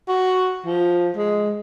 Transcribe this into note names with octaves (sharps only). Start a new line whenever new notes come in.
F#4
F3
G#3